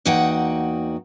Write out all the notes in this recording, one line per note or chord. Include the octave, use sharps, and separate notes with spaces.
E2 A#3 D#4 F#4 F#5 G5